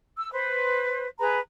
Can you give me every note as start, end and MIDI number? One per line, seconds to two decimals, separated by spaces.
0.16 0.31 88
0.32 1.07 71
0.32 1.07 72
1.19 1.39 68
1.19 1.39 71
1.19 1.39 82
1.19 1.39 83